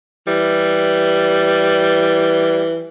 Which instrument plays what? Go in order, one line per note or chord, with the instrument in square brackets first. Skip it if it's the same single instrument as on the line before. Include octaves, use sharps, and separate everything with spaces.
[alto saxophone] E3 [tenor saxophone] G3